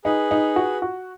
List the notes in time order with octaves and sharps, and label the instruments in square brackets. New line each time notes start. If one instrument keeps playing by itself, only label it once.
[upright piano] D#4 [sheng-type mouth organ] G#4 B4
[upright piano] D#4
F#4
F#4